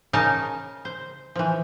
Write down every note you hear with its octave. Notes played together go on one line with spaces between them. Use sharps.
C#3 D#4 A#4 G#5 A5
C5
E3 F3